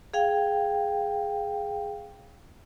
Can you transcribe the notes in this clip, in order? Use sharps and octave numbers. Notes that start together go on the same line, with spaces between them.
G#4 F5 G5